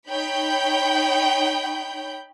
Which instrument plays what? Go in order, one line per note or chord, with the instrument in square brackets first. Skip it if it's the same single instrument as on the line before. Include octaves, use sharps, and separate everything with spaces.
[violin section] D#4 C#5 G5 B5 G6